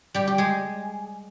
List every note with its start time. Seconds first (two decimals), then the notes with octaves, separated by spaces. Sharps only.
0.14 G3 G4
0.27 G4
0.38 G#3 G#4